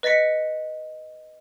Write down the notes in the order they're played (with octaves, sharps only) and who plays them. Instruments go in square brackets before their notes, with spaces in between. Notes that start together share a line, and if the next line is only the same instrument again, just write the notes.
[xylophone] B4 D#5 A6 B6 C#7